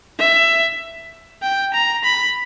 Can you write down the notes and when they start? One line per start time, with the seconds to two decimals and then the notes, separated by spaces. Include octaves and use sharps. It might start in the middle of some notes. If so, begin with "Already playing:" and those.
0.19 E5
1.43 G5
1.74 A#5
2.03 B5